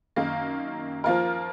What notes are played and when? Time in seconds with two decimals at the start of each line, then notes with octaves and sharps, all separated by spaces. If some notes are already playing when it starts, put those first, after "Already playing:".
0.16 F#2 D#3 A#3 D#4
1.04 F3 A#3 F4 A#4